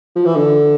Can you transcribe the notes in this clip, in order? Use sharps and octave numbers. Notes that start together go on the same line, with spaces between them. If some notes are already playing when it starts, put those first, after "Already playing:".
F3
E3
D3